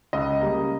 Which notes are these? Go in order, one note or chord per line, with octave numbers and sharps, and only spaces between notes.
C#2 D#5
C#3 G3 A#3